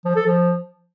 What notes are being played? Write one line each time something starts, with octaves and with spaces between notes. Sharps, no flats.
F3
A4
F3